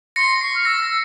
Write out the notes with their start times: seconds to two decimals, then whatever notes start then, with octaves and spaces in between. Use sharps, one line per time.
0.16 C6 A#6 C#7
0.41 C#6 C7
0.55 F6
0.65 E6 A#6
0.82 A#6